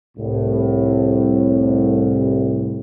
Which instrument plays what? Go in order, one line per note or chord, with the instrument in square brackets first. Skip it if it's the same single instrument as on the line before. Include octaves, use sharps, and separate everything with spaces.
[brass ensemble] C2 A2